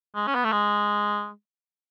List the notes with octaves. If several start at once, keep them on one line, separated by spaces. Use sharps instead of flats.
G#3
C#4
B3
A3
G#3